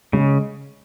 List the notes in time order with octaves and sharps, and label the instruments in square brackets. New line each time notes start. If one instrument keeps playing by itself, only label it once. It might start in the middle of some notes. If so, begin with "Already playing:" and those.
[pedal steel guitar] C#3 [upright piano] G#3